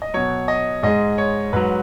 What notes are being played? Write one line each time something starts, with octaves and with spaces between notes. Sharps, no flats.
D#5
B2 F#3 C#5
D#5
G#2 G#3 D#5
C#5
G#2 F#3 B4